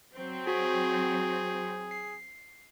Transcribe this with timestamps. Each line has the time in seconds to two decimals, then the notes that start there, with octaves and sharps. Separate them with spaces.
0.16 F#3 C4
0.47 F#4 G#4
1.91 C7